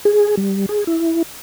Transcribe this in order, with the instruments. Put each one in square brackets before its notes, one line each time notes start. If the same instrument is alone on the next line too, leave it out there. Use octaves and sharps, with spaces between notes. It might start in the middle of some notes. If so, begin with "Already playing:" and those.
[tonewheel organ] G#4
G3
G#4
E4